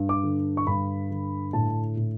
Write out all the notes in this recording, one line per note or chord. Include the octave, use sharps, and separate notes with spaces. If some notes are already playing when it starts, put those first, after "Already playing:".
Already playing: G2
D6
D3
C#6
G2 B5
D3
A2 A5
A2